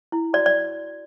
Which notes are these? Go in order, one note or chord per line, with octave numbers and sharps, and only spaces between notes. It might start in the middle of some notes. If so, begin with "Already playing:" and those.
E4
F#4 D5
D5